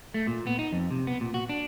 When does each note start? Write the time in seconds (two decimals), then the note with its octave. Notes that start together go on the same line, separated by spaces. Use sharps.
0.14 A3
0.27 A#2
0.47 B3
0.59 D#4
0.73 F2
0.91 C3
1.07 B3
1.21 A#2
1.34 F#4
1.49 D4